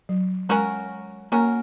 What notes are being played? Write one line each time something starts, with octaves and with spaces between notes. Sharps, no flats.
F#3
F#3 G#3 C#4 F#4 A#4
F#3 A#3 C#4 F#4 A#4